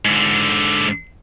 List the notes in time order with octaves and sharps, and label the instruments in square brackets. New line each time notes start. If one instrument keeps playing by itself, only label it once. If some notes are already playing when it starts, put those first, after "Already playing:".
[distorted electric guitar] G#2 D3